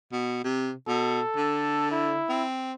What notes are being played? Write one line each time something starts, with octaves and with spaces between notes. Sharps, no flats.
B2
C3
B2 A4
D3
E4
C4